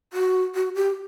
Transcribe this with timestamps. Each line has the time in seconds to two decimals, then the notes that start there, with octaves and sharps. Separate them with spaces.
0.13 F#4
0.55 F#4
0.75 G4